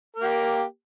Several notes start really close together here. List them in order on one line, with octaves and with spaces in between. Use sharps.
A#4 A#3 G4